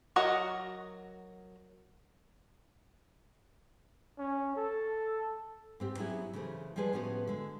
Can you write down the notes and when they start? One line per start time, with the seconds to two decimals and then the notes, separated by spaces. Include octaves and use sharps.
0.16 F#3 F#4 A#4 D#5 F#5
4.19 C#4
4.57 A4
5.80 G#2 C4 G4
5.98 F#3 B3 C#4 E4 G4 G#4
6.33 C#3 E3 A3 G#4 C5
6.76 F3 G3 G#3 G#4 B4 G#5
6.93 A2 F3 B3 C#4 F4 F#4
7.28 D3 G#3